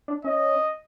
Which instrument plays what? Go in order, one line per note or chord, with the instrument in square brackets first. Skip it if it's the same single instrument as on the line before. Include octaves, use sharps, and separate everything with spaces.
[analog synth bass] D4
[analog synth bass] C#4 [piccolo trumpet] D#5